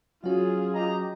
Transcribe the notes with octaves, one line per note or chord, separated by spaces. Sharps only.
F#3 C#4 F4 F#4 G#4 F5
G4 D#5 A#5